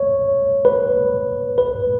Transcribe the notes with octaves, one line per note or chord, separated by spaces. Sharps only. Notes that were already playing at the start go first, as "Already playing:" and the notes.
Already playing: C#5
B4
B4